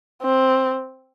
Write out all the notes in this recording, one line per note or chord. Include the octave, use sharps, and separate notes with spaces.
C4